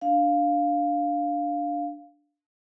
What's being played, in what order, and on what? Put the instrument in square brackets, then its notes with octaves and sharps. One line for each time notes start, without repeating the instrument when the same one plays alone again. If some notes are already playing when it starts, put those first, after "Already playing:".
[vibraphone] D4 F5